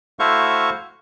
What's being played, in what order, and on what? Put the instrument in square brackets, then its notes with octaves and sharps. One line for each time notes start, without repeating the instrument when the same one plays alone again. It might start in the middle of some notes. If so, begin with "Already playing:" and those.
[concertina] A3 E4 F#4 C5 F5 C#6